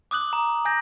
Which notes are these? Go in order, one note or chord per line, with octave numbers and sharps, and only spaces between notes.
D6 D#6 F#6 F#7
A#5
G#5 G6 A#6